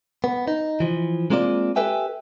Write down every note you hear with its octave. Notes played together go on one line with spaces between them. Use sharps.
B3
D#4
E3 F3
G#3 A#3 C4 F4 D5
G4 A4 B4 E5 G5 G#5